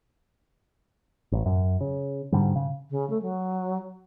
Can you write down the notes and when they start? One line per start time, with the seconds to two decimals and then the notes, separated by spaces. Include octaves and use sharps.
1.32 A1
1.46 F#2
1.81 C#3
2.32 G#2 D3 G3
2.56 C#3
2.90 C#3
3.10 A3
3.22 F#3